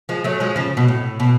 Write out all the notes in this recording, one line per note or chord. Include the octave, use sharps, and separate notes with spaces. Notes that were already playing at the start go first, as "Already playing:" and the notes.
F3 G#3
F#3 A3
F3 G#3
C#3 F3
B2
A2
B2